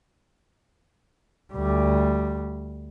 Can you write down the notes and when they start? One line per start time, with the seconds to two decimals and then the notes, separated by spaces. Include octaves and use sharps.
1.53 D2 G3